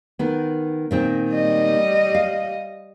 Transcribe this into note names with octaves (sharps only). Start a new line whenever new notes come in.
D#3 B3
A#2 D#3 C4
G3 D#5
F5